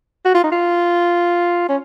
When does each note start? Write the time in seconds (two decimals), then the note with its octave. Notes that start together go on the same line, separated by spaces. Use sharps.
0.25 F#4
0.34 F4
0.44 D#4
0.52 F4
1.69 C#4